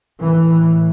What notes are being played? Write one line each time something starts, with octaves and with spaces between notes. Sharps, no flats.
A2 E3